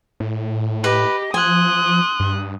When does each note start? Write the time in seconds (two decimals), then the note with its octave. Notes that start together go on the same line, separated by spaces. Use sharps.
0.20 A2
0.84 G4 B4 D#5
1.34 F3 G#5 C6 D#6 F#6
2.20 G2